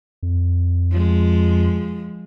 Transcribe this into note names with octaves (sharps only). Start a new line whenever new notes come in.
F2
F3 G#3